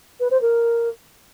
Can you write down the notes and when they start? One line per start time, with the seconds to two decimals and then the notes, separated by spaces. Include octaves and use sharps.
0.20 B4
0.31 C5
0.41 A#4